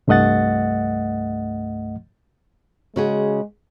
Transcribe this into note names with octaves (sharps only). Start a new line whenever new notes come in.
C2 G2 A3 D#5 F#5 A6
C#3 G#3 F#4 G#4